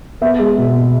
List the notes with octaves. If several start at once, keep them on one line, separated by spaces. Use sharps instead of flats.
B3 E5
G#3
B2
B2